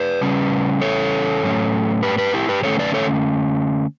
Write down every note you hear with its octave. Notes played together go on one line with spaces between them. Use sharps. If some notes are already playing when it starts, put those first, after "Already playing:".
Already playing: B4 D5
C#3 G3 C#4
A4 C#5
A2 F#3 A3 C#4
G4 B4
G4 B4
E4 G4
G4 B4
D3 A3 C#4 A4 C#5
B4 D5
A4 C#5